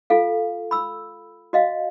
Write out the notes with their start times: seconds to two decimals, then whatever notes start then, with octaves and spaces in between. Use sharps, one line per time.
0.10 F4 A4 F5
0.71 B5 E6
1.53 F#4 D#5 F5